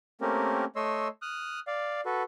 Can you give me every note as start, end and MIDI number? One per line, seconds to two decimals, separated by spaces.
0.21 0.65 57
0.21 0.65 58
0.21 0.65 60
0.21 0.65 61
0.21 0.65 67
0.21 0.65 70
0.76 1.08 57
0.76 1.08 73
0.76 1.08 75
0.76 1.08 84
0.76 1.08 88
1.22 1.60 87
1.22 1.60 89
1.22 1.60 90
1.67 2.01 74
1.67 2.01 77
2.05 2.23 66
2.05 2.23 69
2.05 2.23 71